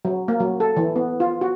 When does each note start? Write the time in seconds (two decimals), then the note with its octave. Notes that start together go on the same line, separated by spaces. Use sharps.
0.05 F#3
0.28 A#3
0.40 F#3
0.60 A4
0.77 E3
0.96 B3
1.20 F4
1.41 F#4